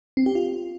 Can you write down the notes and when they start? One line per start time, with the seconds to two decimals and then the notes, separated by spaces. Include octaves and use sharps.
0.17 C4
0.26 G4
0.35 F4